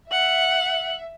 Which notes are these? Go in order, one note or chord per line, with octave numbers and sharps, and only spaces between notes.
E5 F#5 F#7